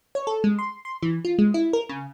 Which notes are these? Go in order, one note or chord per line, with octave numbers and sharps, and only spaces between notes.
C#5
A4
G#3
C6
C6
E3
F4
G#3
E4
A#4
C#3